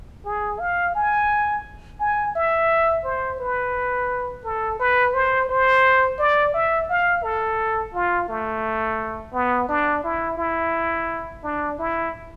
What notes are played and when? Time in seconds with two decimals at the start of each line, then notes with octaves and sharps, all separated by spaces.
0.25 G#4
0.60 F5
0.95 G#5
2.00 G#5
2.35 E5
3.04 C5
3.40 B4
4.44 A4
4.79 B4
5.14 C5
5.49 C5
6.19 D5
6.54 E5
6.89 F5
7.23 A4
7.94 F4
8.28 A3
9.33 B3
9.69 D4
10.04 E4
10.38 E4
11.43 D4
11.78 E4